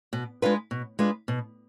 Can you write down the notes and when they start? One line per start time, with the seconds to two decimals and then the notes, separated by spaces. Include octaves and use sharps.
0.13 B2
0.42 G#3 D4 F4 B4
0.71 B2
0.99 G#3 D4 F4 B4
1.28 B2